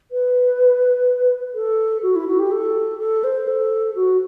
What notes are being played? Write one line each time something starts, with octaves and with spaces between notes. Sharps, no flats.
B4
A4
F#4
E4
F#4
G4
A4
A4
C5
A4
F#4